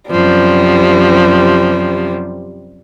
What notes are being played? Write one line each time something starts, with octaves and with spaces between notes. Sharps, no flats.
F#2 C3 F3 G3